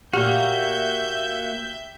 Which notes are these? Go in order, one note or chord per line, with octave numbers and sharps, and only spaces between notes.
A#2 A#3 F#4 G4 E5 F5 F6 G6